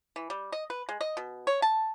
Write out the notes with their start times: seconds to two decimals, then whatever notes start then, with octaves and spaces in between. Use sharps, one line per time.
0.16 E3
0.30 G3
0.52 D#5
0.70 B4
0.89 G#3
1.01 D#5
1.17 B2
1.47 C#5
1.62 A5